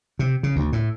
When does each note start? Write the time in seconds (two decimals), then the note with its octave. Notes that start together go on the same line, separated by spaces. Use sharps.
0.19 C3
0.43 C#3
0.56 D2
0.73 A2